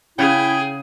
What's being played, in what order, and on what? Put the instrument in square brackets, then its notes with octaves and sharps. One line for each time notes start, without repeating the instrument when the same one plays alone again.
[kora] C#3 F#5 [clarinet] E4 [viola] G#4 [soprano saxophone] G5